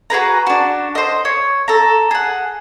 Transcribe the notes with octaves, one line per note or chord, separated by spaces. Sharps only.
F#4 G#4 B4 A#5
D4 F#4
C5 D#5
C#5
A4 A#5
G#4 F#5